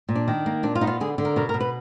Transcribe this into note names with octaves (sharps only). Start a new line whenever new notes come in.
A#2
D4
D#3
A#3
A#2 D4
F4
B3 D#4
F4
D3 G#4
D3
A#4
B2 A#4
A#4
B2
B4